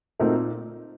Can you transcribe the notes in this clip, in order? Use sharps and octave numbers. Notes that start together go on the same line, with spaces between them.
A#2 A3 C4 D#4 F#4 A#4